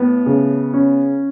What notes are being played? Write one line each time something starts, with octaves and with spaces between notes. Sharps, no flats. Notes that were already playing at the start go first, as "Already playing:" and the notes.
Already playing: A2 B3
C#3
C#4